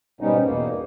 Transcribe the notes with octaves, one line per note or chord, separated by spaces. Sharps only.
G#2 B2 G3 B3 C#4 D#4
E2 B2 A#3